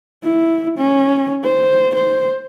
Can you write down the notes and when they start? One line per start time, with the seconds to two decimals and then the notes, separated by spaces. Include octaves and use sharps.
0.23 E4
0.78 C#4
1.43 C5
1.95 C5